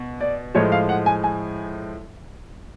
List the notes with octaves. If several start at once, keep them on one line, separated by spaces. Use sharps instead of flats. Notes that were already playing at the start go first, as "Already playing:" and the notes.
Already playing: B2
D5
A2 F3 G#3 C#5
F5
F#5
G#5
G#5